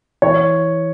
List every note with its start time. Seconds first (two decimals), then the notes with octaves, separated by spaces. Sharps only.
0.22 E3 C#5